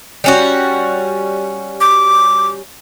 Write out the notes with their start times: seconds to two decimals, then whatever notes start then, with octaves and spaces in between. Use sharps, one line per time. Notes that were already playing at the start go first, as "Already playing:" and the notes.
0.24 G3 C#4 F#4
1.81 D6